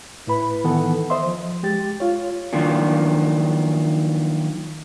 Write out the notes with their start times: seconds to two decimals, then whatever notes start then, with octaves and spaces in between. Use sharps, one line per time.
0.27 A2 E4 B4 B5
0.64 D#3 E3 B3 A4 F#5
1.10 C5 D#5 E5 C6
1.24 F3
1.63 G#3 G4 A6
2.00 F4 C#5
2.53 D#3 F3 F#3 A#3 D4